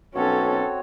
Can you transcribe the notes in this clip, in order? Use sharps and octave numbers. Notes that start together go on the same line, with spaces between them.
B1 C4 C#4 F#4 A4 C#5